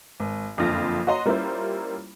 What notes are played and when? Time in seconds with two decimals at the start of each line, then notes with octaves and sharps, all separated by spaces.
0.20 G#1
0.57 F#1 F2 D3 F4 A#6
1.07 F#4 C#5 D#5 A#5 C6
1.26 G3 A#3 C#4 E4 F4 C5